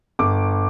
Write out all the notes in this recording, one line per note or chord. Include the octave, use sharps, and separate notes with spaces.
G1 D6